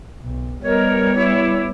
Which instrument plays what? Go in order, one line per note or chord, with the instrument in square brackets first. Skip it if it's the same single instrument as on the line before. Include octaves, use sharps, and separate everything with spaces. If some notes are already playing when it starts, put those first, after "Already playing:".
[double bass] B1
[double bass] G3 B3 [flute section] A#4 D#5 [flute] C#5
[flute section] E4 D6